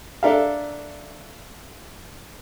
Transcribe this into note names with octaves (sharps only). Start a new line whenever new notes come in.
D4 A4 A#4 E5 F5